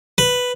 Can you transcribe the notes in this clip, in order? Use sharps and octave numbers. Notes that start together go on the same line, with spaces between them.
B4